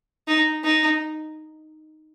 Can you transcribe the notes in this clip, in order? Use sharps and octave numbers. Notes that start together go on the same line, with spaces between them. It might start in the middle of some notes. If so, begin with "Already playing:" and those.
D#4
D#4